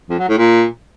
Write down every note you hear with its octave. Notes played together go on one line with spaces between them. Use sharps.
F2
F#3
A2
A#2